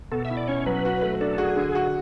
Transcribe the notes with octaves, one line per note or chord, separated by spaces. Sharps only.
B2 A4
E5
E4
D5
C#4 C#5
F#3 B4
F#4
A3
D4 A4
F#4 G#4
D3
F#4